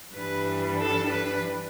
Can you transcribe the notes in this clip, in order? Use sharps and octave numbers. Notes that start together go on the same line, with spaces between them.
G2 E3 G3 D4 B4
A4
B4